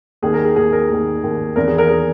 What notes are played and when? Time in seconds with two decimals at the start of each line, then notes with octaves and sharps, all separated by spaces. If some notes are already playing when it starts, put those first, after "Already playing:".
0.22 D#2 D#3 G#4
0.33 A#4
0.45 G#4
0.56 D#2 D#3 G#4
0.73 A#4
0.90 D#2 D#3
1.23 D#2 D#3
1.56 E2 D#3 A#4
1.68 G#4
1.78 A#4
1.89 D#3 G#4